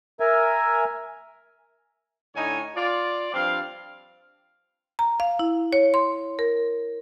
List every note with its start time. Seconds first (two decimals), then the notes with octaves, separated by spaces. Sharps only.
0.20 A#4 E5 G#5
2.35 A2 D3 D#4 C#5 G#5
2.76 F4 D5
3.34 G2 F3 C4 F5
4.99 A#5
5.20 F5
5.39 E4
5.73 C#5
5.94 C6
6.39 A#4